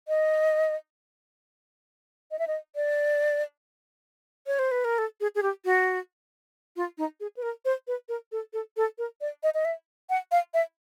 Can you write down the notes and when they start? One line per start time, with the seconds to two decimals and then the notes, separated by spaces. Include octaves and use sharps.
0.08 D#5
2.31 D#5
2.39 E5
2.47 D#5
2.75 D5
4.47 C#5
4.59 C5
4.71 B4
4.84 A#4
4.98 A4
5.20 G#4
5.35 G#4
5.42 G4
5.65 F#4
6.76 F4
6.98 D#4
7.20 G#4
7.37 B4
7.42 A#4
7.65 C5
7.87 B4
8.09 A#4
8.32 A4
8.53 A4
8.77 A4
8.98 A#4
9.21 D5
9.43 D#5
9.54 D#5
9.65 E5
10.10 F#5
10.31 F5
10.54 E5